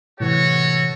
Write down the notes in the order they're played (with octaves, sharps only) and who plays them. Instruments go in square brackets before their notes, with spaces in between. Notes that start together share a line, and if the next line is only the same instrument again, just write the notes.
[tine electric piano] A2 C3 E3 [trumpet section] F#4 A4 C#5